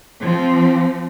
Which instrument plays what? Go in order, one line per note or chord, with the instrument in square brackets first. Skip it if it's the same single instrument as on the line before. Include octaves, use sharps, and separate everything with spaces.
[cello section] F3 C4